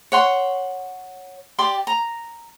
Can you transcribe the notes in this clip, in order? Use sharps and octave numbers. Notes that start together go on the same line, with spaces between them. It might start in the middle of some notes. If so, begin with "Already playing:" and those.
C#5 F#5 C6
G4 D5 C6
A#5